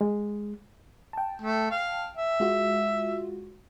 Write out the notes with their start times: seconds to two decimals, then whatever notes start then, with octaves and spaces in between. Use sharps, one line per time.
0.01 G#3
1.13 G5 A5
1.42 A3
1.71 F5
2.17 E5
2.40 G#3 F4 F#4